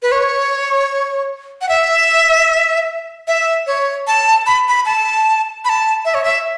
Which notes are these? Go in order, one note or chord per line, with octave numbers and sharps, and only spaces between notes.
B4
C#5
F#5
E5
E5
C#5
A5
B5
B5
A5
B5
A5
E5
C#5
E5